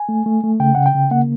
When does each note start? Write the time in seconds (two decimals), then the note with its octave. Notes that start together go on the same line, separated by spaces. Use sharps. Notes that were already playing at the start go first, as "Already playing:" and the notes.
Already playing: G#5
0.09 A3
0.26 A3
0.43 A3
0.60 C#3 G5
0.75 C#3 F#5
0.86 G5
0.95 C#3
1.11 A#3 F#5